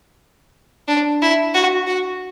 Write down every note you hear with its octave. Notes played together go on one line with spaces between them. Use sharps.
D4
E4
F#4
F#4